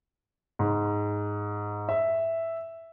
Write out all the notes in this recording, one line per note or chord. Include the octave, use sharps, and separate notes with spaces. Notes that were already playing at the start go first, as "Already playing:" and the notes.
G#2
E5